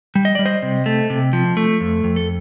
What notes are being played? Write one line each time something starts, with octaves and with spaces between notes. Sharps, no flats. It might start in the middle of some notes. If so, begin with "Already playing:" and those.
G3
D#5
G3 D5
C5 D#5
C3
A3
C3
F3
A3
F2
F2
A4